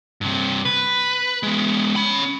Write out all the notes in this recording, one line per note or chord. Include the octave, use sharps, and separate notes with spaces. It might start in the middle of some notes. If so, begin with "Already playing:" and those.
G2 C3
B4
G#3 B3
C#4 B5